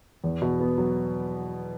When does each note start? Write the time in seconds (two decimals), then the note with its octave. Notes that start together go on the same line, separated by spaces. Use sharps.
0.24 E2
0.42 B2
0.60 B3
0.78 F#3